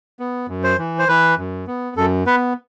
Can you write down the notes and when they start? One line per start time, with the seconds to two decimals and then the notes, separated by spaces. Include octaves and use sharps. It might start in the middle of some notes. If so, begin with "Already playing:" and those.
0.19 B3
0.49 F#2
0.63 C5
0.78 E3
0.99 C5
1.08 E3 B4
1.38 F#2
1.67 B3
1.97 F#2 A4
2.26 B3 B4